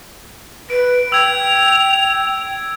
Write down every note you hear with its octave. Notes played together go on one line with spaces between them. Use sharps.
B4 D7
G5 E6 G#6 F7